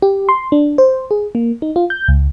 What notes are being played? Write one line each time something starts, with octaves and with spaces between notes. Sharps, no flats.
G4
C6
D4
C5
G#4
A#3
D#4
F4
G6
C#2